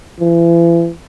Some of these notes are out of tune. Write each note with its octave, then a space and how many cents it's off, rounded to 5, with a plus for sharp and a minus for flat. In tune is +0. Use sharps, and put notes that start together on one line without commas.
E3 +40